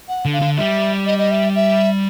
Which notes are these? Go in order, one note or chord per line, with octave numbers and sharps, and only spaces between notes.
F#5
D3
F5
D3
G3 E5
D#5
D#5
E5
E5